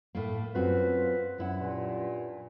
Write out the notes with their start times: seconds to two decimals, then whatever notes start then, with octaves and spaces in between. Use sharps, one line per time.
0.15 A2 A3 A#3
0.55 F#2 C4 F4 F#4 B4
1.38 F#2 E4 F#5
1.61 G2 A#2